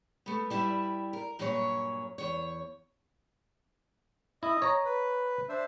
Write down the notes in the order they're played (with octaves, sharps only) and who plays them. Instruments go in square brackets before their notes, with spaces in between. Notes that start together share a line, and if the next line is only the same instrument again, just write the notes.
[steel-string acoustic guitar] A3 B3
G3 E4 D5 E5
A#4
G2 A#2 F#3 C#4 G#4 C#5
E2 C#5
[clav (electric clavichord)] E4 [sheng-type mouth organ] D#5
[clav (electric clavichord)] C#5 A#5
[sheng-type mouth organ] B4
D4 C5 E5